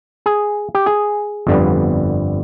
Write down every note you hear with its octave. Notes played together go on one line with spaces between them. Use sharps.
G#4
G4
G#4
G1 F2 D3 G3 B3